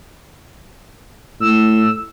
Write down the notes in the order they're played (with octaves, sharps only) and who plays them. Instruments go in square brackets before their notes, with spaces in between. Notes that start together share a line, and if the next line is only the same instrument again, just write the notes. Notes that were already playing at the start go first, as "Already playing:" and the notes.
[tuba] A2 [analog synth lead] E6